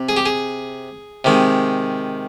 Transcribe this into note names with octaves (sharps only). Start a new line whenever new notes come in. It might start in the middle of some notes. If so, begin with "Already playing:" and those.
Already playing: C3
G#4
G4
G#4
C3 D#3 G#3